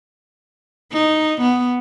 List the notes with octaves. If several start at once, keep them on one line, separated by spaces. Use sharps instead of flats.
D#4
B3